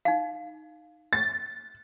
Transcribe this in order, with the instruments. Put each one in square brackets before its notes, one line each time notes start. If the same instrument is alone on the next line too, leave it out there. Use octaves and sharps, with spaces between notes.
[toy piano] D#4 F5
[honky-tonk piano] A6